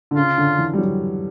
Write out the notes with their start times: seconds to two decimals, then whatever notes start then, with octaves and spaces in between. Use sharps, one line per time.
0.11 D3
0.16 C#3 F4
0.38 D3
0.58 E3
0.74 G3
0.78 F#3